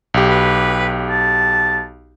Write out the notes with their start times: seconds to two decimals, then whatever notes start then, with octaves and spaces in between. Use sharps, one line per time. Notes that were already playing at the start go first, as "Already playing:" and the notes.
0.14 B1 G4
0.30 B4
1.10 A5